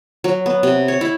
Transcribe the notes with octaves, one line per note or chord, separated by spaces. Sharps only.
F#3
B3
C3
C#5
E4